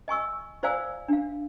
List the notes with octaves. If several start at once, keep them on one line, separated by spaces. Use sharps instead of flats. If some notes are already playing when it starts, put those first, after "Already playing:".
D#5 G#5 C#6 E6
F4 C5 D5 F5 G#5 E6
D4 F5